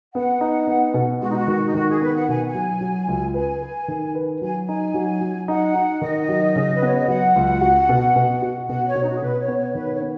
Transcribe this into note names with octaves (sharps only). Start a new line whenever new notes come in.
B3 F#5
D#4
B3
B2
G#3 F#4
D#4
F#4
D#3
D#4
D#3 F#4
G#4
B3 B4
F#5
B2 G#5
G#5
F#3
F#3
C#2
B4 G#5
B4
D#3
B4
F#3 G#5
D#4 G#5
F#3
F#3
D#4 F#5
D#4
D#3 D#5
F#3
C#3
B4
B3 C#5
D#5
F#3 F#5
C#2
F#4
B2
B2
F#4
B2 F#5
C#5
B2
D#4
F#4
G#4
B2 B4
C#5
B3
C#5
D#3 B4
C#5
B3